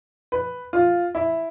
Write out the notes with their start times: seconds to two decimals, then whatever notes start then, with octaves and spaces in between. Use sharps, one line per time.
0.32 B4
0.73 F4
1.15 E4